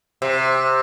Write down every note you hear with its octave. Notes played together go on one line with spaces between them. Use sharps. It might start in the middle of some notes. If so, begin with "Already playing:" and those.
C3